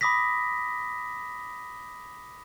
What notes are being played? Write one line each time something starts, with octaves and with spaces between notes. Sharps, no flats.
B5 D6 D#6 A#6 B6